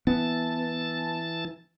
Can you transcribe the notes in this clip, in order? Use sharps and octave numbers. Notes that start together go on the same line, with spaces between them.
E3 B3 A5